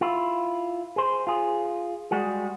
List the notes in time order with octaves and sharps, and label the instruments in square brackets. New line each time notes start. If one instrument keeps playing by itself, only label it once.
[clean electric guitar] E4 F4
G#4 C5
F4 G#4
G3 G#3 F#4 G#4